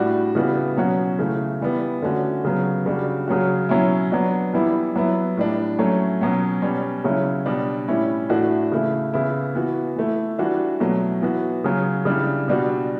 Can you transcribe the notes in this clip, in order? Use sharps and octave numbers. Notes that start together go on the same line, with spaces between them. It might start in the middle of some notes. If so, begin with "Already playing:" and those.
Already playing: A2 G3 D4 F#4
C#3 E3 G3 B3 F#4
B2 F#3 C#4 F#4
C#3 E3 A3
E3 G3 B3
D3 A3 C#4 F#4
C#3 F#3 B3
C#3 G3 D4 F#4
C#3 F#3 C#4 F#4
B2 F#3 C#4 E4
F#3 B3 D4 F#4
E3 G3 B3 E4
F#3 B3 E4
A2 G3 D4
F#3 A3 C#4
B2 F#3 C#4
B2 G3 C#4
C#3 F#3 C#4 E4
B2 G3 D4
A2 G3 C#4 E4
A2 E3 A3 D4 F#4
C#3 E3 A3 E4
C#3 E3 B3 E4
E3 B3 F#4
E3 A3 E4
E3 G3 D4 F#4
B2 F#3 A3
E3 B3 F#4
C#3 F#3 C#4
C#3 E3 G3 D4
B2 G3 D4 F#4